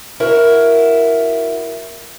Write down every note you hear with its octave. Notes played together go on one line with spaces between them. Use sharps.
E4 F#4 A#4